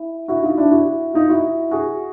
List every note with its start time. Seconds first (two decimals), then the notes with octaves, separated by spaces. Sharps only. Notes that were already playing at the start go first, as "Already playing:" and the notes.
Already playing: E4
0.28 E4 F#4
0.43 D#4 F4
0.58 D4 E4
0.71 E4 F#4
1.14 D#4 F4
1.29 E4 F#4
1.71 F#4 G#4